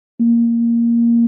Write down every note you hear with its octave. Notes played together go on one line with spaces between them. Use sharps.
A#3